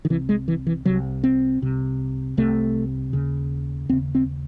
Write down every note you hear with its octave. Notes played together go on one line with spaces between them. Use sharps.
D#3
C2 C3 E3
G#3
E3
E3
C2 C3 F#3
C4
C2 C3
C2 C3 A3
D#2 C#3
D#2 C#3 C4
C4